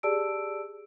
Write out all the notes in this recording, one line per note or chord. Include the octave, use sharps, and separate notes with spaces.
G4 G#4 D5 A5 E6 D7